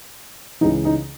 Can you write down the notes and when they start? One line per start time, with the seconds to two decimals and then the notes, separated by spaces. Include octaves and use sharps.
0.61 C#2 C#3 E3 D#4
0.85 D#4